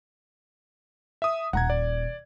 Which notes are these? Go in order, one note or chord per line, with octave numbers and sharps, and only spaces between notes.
E5 D#6
D#1 F#5 A#5 G#6
D5